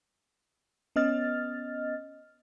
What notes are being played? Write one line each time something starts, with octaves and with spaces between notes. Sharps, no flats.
B3 C#4 D#5 F6 A6